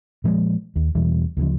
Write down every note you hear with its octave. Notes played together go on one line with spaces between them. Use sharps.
A#2 F3 F#3 G#3
D#2
E2 B2 E3 G3
D2 C#3 F3